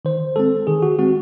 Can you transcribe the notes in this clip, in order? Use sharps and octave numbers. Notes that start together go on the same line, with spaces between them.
D#3 C5
G#3 C4 A4
D#3 G#4
F#4
G#3 C4 F#4